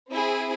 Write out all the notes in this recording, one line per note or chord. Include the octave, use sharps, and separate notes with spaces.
C4 E4 G#4